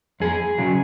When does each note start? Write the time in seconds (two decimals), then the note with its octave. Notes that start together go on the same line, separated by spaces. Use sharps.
0.20 F2 G#4
0.58 C#3 F#3